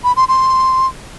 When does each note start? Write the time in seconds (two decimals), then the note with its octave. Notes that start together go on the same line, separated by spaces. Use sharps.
0.04 B5
0.17 C6
0.28 C6